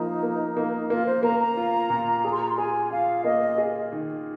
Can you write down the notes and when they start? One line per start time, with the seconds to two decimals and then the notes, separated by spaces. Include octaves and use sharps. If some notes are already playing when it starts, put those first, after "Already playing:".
Already playing: F3 A#3 D#4
0.23 A#3
0.57 A#3
0.90 A#3 F4
1.06 C5
1.23 A#3 A#5
1.40 A#5
1.57 F4
1.90 A#2
2.25 G#4
2.32 C6
2.41 A#5
2.49 C6
2.58 G#4 G#5
2.91 F4 F5
3.24 A#3 D#5
3.58 G#4
3.92 D#3